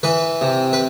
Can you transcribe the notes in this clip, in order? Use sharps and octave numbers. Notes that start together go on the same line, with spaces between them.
E3 B4
C3
B4